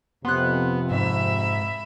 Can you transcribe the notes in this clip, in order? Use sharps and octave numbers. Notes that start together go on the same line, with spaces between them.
F2 C3 B3 C6 F#6
G#2 E5 B5